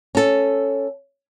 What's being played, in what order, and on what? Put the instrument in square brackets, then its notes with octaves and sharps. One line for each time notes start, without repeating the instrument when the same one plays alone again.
[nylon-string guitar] C#4 A4